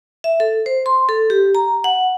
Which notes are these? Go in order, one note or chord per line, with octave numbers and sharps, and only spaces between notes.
E5
A4
C5
C6
A4
G4
A#5
F#5